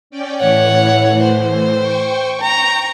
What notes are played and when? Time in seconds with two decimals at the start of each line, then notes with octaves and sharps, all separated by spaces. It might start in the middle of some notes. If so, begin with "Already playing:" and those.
0.10 C#4 D5 G5
0.40 A2 E3 C#5 F#5
1.22 C5
1.78 G5 C#6
2.42 A#5